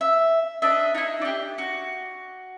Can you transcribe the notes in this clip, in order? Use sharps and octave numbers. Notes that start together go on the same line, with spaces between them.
E5
D4 D#5 E5
D#4 E4
D4 G4
F#4